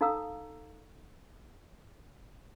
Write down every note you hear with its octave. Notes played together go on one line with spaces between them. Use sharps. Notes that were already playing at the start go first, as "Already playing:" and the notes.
D#4 A4 F5 A#5 D#6 E6